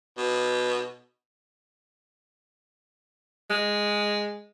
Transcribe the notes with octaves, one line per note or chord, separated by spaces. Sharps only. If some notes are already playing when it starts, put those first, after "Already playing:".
B2
G#3